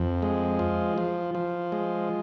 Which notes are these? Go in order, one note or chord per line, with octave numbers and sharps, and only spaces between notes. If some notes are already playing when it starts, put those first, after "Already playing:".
Already playing: F2
G#3
F3
F3
F3
G#3